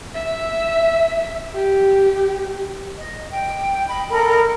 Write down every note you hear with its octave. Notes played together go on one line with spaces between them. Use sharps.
E5
G4
D#5
G5
D#5 B5
A4 A#4 D#5 B5